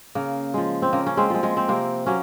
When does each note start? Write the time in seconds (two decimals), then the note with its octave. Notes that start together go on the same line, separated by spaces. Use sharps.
0.15 C#3 A#3
0.54 F3 G#3
0.82 C4
0.93 C#3 A#3
1.07 C#4
1.17 G#3 C4
1.30 F3 G#3
1.43 G#3
1.57 C4
1.69 C3 A#3
2.06 F#3 A#3 C#4